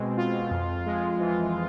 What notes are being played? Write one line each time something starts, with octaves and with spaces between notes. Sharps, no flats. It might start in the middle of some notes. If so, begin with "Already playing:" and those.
Already playing: B2 G#3 C4
F4
F2
G#3
E3